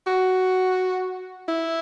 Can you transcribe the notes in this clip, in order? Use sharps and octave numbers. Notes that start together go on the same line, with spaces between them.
F#4
E4